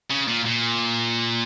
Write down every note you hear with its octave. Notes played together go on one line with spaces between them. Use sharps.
C#3
A#2
A#2